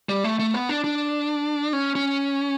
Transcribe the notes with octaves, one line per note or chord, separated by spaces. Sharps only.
G3
A3
A3
B3
D4
D4
C#4
C#4